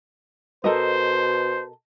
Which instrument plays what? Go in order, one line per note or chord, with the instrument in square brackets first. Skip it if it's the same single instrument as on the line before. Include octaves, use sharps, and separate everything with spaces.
[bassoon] B2 [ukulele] A4 A#4 D#5 [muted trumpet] C5